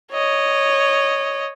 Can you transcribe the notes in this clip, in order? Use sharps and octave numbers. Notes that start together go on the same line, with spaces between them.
C#5 D#5